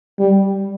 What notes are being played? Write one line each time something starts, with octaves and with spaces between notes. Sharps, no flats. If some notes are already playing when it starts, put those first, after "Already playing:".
G3